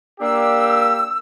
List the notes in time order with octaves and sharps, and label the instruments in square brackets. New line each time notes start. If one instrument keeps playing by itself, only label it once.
[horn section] A#3 D4 G4 [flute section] E6